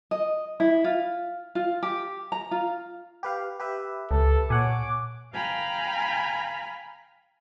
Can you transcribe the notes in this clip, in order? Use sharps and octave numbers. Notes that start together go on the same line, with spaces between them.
D#5
E4
F4
F4
G4
A#5
F4
G4 B4 F5
G4 B4 E5
C#2 A4
A#2 C#5 F#5 G#5 D6
F5 G5 G#5 A#5 B5 F6